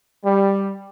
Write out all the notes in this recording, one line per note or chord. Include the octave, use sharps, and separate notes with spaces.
G3